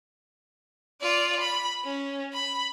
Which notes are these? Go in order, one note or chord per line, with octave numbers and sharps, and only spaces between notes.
F4 D5
B5
C#4
B5